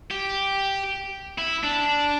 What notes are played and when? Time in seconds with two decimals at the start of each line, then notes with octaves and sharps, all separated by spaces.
0.11 G4
1.38 E4
1.64 D4